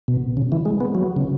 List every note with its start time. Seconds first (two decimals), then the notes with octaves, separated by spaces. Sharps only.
0.08 B2
0.37 C#3
0.52 E3
0.65 G#3
0.80 B3
0.95 F#3
1.16 C#3